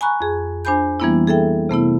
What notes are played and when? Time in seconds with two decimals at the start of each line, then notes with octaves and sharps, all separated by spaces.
0.01 G#5 A#5 B5 C#6 F#6
0.21 F2 G#4
0.65 D4 C5 G#5 B5 G6
1.00 E3 G3 A#3 B3 D4 E4
1.27 G#4 A4 E5 G5
1.69 C3 A3 B3 E4